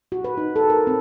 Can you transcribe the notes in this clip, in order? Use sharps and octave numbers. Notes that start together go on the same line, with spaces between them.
F#4
B4
D#4
A4
A#4
C4